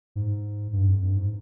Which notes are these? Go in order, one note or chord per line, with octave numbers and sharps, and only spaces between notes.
G#2
G2
F2
G2
G#2